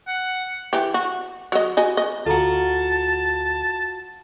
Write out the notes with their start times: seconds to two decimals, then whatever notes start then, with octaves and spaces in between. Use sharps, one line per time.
0.07 F#5
0.73 E3 G4
0.94 F#4
1.52 F#3 D#5
1.77 F#4 D#5 G#5
1.97 D#5
2.26 D2 F4 F#4 A4 A5 A#5